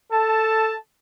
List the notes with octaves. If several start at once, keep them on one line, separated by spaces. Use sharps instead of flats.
A4 A5